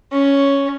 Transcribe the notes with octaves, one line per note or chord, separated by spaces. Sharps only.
C#4